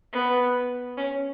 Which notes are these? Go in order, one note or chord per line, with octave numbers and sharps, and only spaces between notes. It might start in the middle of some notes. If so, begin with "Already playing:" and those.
B3
C#4